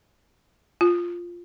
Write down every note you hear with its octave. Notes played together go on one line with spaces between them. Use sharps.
F4